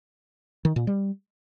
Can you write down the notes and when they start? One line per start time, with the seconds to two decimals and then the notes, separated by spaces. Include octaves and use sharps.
0.65 D#3
0.76 A#2
0.87 G3